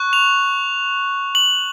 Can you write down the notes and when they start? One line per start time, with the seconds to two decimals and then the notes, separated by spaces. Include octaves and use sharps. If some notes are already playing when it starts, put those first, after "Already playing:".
Already playing: C#6 F#6
0.13 F7
1.35 F#7